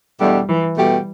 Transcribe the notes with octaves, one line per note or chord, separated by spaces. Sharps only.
E2 B2 G3 A3 D4 G4
E3
B2 G3 A3 G4